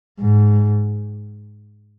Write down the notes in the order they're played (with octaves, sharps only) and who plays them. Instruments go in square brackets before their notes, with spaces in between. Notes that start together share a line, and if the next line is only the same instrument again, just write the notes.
[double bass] G#2